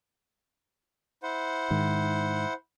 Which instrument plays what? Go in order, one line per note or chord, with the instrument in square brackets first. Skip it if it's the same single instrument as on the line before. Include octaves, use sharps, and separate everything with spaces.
[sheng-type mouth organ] E4 C5 F#5
[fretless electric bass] G#2 D#3